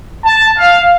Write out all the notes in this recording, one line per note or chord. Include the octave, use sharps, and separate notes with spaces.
A5
F5